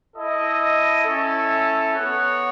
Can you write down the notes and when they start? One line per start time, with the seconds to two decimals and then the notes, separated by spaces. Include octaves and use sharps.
0.14 E4 A4 D#5
1.04 C#4 E4 A4
1.94 B3 F#4 C#5 F#5